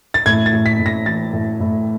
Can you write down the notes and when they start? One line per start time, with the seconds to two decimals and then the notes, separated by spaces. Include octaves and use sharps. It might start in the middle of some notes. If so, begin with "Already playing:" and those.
0.14 A6
0.26 A2 G#6
0.46 A6
0.53 A2
0.66 B6
0.79 A2
0.86 A#6
1.06 E3 A6
1.33 A2
1.60 A2